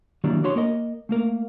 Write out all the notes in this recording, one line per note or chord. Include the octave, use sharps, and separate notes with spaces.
D#3 E3 F#3 G3 A#3 D4
D4 F#4 C#5 C6
A#3 A#4 D#5
A3 A#3 A#4